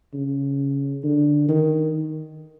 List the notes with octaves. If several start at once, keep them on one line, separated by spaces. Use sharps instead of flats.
C#3
D3
D#3